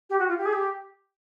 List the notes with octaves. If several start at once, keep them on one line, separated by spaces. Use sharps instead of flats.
G4
F#4
F4
G4
G#4
G4